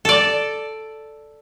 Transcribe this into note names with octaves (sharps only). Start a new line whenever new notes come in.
A4 D5